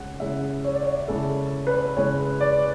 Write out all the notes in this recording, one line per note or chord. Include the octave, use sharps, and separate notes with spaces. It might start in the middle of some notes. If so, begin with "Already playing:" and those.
Already playing: C#3 G#3 C#4 F#5
C#3 G#3 C#4 E4 E5
C#5
D5
C#5
C#3 G#3 C#4 E4 A4
B4
C#3 G#3 C#4 E4 C#5
D5